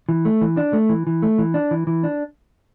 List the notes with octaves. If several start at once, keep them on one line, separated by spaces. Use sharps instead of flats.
E3
A3
E3
D4
A3
E3
E3
A3
E3
D4
E3
E3
D4